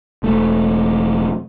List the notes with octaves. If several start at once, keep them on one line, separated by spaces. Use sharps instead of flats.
E1 A3